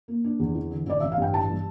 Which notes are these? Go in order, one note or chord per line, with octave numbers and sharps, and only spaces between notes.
A#3
D4
E2
E3
D3
A1 D5
A1 E5
F5
G2 G5
E3 A5
G3